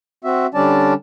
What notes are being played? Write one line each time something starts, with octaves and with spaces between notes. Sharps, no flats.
C4 F#4 E5
D3 G3 C#4 D4 D5 A5